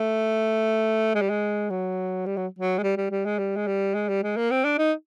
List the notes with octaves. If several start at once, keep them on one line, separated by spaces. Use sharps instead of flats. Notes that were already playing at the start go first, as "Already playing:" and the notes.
Already playing: A3
G#3
G3
G#3
F#3
G3
F#3
F#3
G#3
G3
G3
G3
G#3
G3
G#3
G3
G#3
G3
G#3
A#3
C4
D4
D#4